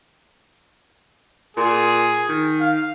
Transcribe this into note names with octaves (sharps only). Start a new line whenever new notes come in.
A#2 G#4
D#3
F5